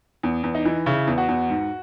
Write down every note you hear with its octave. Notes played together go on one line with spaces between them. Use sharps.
E2
E2
D#4
E3
C#3 E4
E2
F#4
E2
G#2